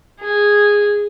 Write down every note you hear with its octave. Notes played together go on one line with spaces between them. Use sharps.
G#4